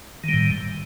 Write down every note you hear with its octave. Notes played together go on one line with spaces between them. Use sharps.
A2 D#3 G3